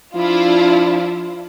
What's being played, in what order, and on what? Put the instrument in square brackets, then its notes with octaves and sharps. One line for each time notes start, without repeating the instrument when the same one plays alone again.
[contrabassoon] F3 [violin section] D4 E4 F4